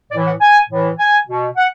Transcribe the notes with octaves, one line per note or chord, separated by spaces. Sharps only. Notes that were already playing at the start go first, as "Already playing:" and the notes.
A2 E3 D5
F#5
G#5
A2 E3
G#5
B2
F#5